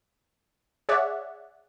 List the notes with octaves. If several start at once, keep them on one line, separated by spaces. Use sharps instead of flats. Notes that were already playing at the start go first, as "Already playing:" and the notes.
G#4 C#5 D5 E5 F#5